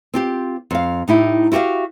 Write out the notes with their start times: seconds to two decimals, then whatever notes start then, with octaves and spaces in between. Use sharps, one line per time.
0.14 C4 F4 G4
0.71 F2 F5
1.08 A2 D#4 E4 G4
1.52 E4 F#4 G4 E5 F5